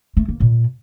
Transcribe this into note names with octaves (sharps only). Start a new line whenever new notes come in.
A3
A#3
A#2